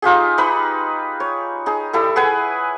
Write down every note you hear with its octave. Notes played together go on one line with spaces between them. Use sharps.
D#4 F4 G4 G#4
D#4 B4 B5
C#5
D#4 G#4
G3 E4 A4
G#4 B4 F#5 G#5